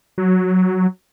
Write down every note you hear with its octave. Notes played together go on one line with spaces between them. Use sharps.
F#3